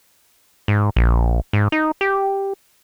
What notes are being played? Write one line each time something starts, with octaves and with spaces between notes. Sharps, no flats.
G#2
A#1
G#2
D#4
G4